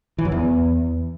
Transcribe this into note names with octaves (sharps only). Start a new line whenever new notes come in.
E3
F#2
E2